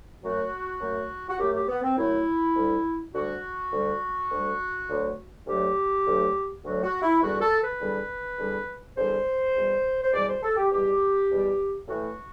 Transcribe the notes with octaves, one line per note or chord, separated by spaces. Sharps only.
F#2 F#3 A3 F#4
F#2 F#3 A3
F#4
F#2 F#3 A3 G4
G4
B3
C4
F#2 F#3 A3 E4
D2 D3 G3
D2 D3 G3 F#4
D2 D3 G3
D2 D3 G3
D2 D3 F#3 A3
D2 D3 F#3 A3 G4
D2 D3 F#3 A3
D2 D3 F#3 A3 F#4
F#4
E4
E2 D3 G3 F#4
A4
B4
E2 D3 G3
E2 D3 G3
E2 D3 G3 C5
E2 B2 G3
C5
E2 B2 G3 D5
C5
A4
G4
E2 B2 G3 G4
E2 B2 G3
A2 E3 A3 F#4